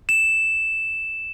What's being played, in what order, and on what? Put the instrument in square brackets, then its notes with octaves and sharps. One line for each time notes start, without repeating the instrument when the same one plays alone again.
[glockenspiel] E7